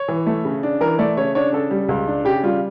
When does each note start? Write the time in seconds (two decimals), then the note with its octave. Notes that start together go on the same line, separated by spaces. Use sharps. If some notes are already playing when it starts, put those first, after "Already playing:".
Already playing: C#5
0.08 E3
0.26 A3
0.45 C#3
0.63 D4
0.81 E3 A#4
0.99 A3 D5
1.17 C#3 C#5
1.35 D4 C#5
1.53 C#3 A4
1.71 G3
1.89 C#2
2.07 D4
2.25 C#3 G4
2.43 G3 F4